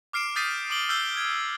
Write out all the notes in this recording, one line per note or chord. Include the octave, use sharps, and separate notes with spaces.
D6 F6 C7 D7 E7
D#6 G6 A6 B6 C7 D#7
D6 D7 F#7 G7
E6 F6 G6 C7 G7
G#6